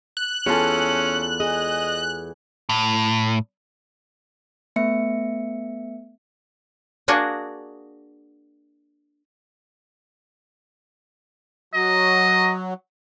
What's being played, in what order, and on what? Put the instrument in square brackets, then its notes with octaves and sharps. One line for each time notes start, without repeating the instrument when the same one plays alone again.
[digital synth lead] F#6
[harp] E2 F4 A5 [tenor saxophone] C#4 [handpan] G#4 A4
[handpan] G#4 [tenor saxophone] D#5
[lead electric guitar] A2
[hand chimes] A3 B3 E5 C#7
[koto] A#3 D4 F#4 G#4 D#5
[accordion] F#3 [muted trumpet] D#5